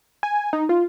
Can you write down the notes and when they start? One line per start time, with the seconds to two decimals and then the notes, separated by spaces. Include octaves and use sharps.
0.23 G#5
0.53 D#4
0.69 F4